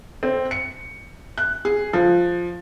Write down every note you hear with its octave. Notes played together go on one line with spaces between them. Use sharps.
C4
C#7
F#6
G#4
F3